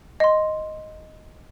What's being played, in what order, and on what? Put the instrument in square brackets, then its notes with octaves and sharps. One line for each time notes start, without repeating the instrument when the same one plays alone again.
[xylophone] D#5 C6